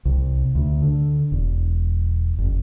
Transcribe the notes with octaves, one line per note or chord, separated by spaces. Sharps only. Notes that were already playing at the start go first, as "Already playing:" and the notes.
C2
D2
D3
E1
F#1